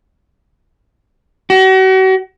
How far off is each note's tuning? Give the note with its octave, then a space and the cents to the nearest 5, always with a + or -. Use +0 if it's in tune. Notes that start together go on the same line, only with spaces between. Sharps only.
F#4 +40